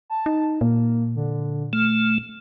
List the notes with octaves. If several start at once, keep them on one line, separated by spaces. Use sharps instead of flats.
A5
D#4
A#2 A#3
D3
A3 F6